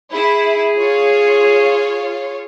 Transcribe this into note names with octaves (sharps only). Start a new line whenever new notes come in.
E4 G#4
F4 C#5